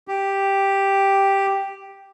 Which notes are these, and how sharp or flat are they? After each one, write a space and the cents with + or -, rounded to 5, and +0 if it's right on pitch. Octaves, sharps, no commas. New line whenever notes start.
G4 +0